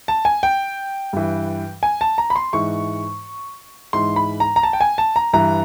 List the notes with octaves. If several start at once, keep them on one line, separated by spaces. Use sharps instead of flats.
A5
G#5
G5
G2 E3
G#5
A5
A#5
B5
C6
G#2 E3 C#6
G#2 E3 C6
B5
A#5
A#5
A5
G5
G#5
A5
A#5
G2 E3 A#5